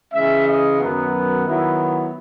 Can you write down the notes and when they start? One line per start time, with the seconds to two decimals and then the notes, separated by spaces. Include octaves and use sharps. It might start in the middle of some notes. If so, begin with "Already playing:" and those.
0.13 C#3 E3 G#3 C#4 E5
0.46 D#5
0.80 F#2 D#3 F#3 B3
1.47 D#3 F#3 B3 E4